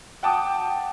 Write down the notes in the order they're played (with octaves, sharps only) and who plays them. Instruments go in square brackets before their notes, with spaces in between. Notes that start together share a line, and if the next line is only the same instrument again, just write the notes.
[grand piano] F#5 G5 A5 D6 D#6